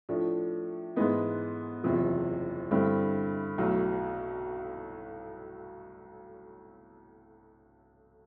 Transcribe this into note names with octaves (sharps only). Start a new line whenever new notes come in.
A2 F3 A3 D4
G#2 E3 G#3 B3 D#4
F#1 E2 C3 F3
G2 D3 G3 C4 E4
B1 A2 F#3